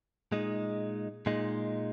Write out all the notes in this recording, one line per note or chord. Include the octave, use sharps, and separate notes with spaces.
A#2 G#3 D#4
A#2 G#3 D#4